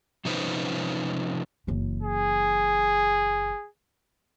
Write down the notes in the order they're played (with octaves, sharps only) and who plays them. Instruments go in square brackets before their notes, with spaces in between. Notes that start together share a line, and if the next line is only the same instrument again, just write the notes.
[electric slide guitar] C3 F3 C#4 D#4 B4 C5
[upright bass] F#1 E3
[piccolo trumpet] G#4